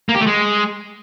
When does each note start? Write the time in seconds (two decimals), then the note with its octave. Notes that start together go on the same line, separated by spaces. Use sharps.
0.09 A#3
0.15 G4
0.21 A3
0.27 G#3